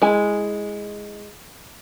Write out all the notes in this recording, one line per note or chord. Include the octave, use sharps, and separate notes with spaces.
G#3 E4 G#5